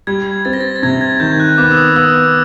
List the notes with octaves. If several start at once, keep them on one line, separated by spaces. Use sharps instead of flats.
G3 G#6
C4 A6
A#6
A6
A6
C3 G#6
G#6
D#3 G6
F#6
B3 D6
E6
D#6
B3 E6